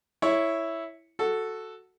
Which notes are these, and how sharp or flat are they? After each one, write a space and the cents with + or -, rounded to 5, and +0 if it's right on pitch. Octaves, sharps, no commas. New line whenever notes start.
E4 +0 C#5 +0
F#4 +0 A4 +0